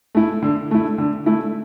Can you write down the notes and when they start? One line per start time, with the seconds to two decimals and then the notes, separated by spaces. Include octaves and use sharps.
0.15 A3 E4
0.42 D3
0.71 A3 E4
0.98 D3
1.26 A3 E4